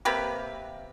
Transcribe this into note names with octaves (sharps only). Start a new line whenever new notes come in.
C3 A#3 G4 B4